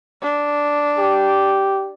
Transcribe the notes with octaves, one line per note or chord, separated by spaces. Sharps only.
D4
G4